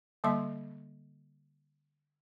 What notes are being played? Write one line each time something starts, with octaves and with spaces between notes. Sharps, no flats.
D3 G3 A#3 D#5 E5 C6